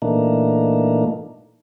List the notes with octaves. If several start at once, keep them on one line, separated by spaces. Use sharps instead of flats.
A#2 E3 A3 A#3 D4 D#4